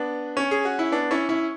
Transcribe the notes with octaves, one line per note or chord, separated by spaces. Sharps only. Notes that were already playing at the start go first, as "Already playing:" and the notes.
Already playing: B3 D4
C#4
G#4
F#4
E4
B3 D4
C#4 E4
C#4 E4